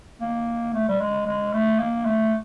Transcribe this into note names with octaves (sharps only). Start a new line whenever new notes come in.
A#3
A3
G3
G#3
G#3
A3
A#3
A3